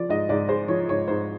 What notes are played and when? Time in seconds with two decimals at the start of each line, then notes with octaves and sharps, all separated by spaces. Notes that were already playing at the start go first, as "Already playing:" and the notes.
Already playing: F3 D5
0.09 G#2 D#5
0.29 G#2 D5
0.49 G#3 C5
0.68 F3 C#5
0.89 G#2 C#5
1.08 G#2 C5